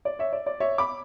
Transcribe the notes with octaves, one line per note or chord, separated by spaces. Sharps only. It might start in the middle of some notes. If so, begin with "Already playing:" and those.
D5
C#5 E5
D5
D5
C#5 E5
B5 D6